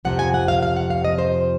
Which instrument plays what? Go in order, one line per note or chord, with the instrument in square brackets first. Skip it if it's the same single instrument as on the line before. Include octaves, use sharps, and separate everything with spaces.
[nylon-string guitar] F2 C3 F3 F#5
G#5
F#5
F5
F5
F#5
F5
D#5
C5